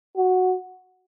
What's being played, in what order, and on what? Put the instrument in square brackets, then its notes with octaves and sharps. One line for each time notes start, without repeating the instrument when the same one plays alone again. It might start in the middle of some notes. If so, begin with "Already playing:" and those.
[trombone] F#4